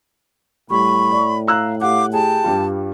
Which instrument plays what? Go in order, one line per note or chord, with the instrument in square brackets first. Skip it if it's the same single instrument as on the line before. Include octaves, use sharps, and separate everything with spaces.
[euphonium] A2 [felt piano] G3 [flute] B5 [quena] C#6
[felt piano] D5
[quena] F5 [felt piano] A#5 E6 F#6
[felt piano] G4 F#5 [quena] F5 [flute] D6
[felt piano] G4 G#4 [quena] G5 [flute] A5
[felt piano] G2 G3 F4